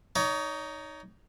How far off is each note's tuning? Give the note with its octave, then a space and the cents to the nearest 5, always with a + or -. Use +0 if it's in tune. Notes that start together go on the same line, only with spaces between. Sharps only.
D#4 +0 C#5 +30